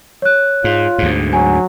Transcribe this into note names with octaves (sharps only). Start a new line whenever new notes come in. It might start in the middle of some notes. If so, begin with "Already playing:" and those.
C#5 F#6
G#2 F4
D2 G#2
F#3 G#5